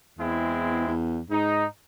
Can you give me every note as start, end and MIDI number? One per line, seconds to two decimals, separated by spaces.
0.19 0.84 40
0.19 0.93 56
0.19 0.93 60
0.19 0.93 64
0.87 1.20 40
1.30 1.65 44
1.30 1.66 63